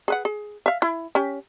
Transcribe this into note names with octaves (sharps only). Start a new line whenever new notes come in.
G#4 B4 F#5
G#4
E5 F5
E4
C#4 G4